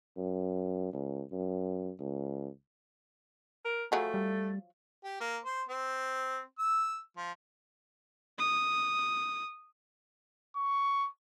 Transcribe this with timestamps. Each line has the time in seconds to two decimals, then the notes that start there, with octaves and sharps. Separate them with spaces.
0.17 F#2
0.93 C#2
1.32 F#2
2.00 C#2
3.65 A#4
3.92 F3 F#3 A3 G#4
4.14 G3
5.04 G4
5.20 A#3
5.45 C5
5.69 C4
6.59 E6
7.16 F3
8.39 D#6
10.56 C#6